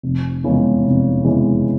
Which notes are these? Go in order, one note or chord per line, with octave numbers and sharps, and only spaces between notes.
F1
E2 C#3 E3 G#3
F1
E2 C#3 E3 G#3